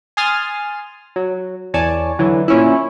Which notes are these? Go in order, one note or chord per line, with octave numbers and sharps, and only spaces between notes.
G#5 C6 D#6 F6 A6
F#3
E2 C#5 D5 G#5 A5
D3 E3 F#3
A#2 C#4 E4